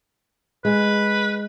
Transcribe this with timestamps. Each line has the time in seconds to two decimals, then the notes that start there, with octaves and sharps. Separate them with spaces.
0.65 G#3 B4